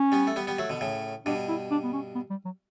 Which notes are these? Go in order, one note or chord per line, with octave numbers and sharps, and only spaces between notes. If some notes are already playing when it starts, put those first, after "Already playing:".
Already playing: C#4
G3 B3
A3
G3 B3
G3 B3
F#3 A3
B2 D3
A2 C#3
G2 B2 D4
E4
D4
B3
C#4
B3
G3
F#3